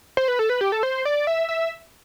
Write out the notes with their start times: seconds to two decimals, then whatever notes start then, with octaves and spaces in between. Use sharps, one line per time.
0.17 C5
0.28 B4
0.39 A4
0.49 B4
0.61 G4
0.72 A4
0.83 C5
1.05 D5
1.27 E5
1.49 E5